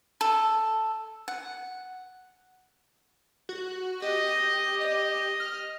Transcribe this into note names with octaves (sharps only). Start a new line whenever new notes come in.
A4
F#5
F#4
G4 D#5
D#5
F6